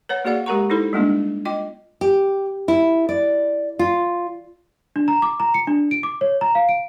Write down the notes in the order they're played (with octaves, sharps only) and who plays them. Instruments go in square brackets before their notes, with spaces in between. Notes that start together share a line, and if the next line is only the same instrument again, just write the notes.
[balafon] B4 C#5 F#5
A#3 F#4 G#4 D5 F5 F#5
G#3 G4 A#4 F#5 A#5 C#6
D#4 E4 A4 C5 B5
G3 G#3 A#3 B3 D4 F4
F4 D#5 G5 D6
[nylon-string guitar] G4
E4
D5
F4
[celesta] D4
A#5
D6
A#5
C#7
D4
D7
D6
C#5
A#5
F5
D7